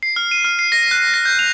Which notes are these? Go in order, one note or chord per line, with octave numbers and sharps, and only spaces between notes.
C7
F6
D#7
F6
C7
A#6
F#6
A#6
G6
F7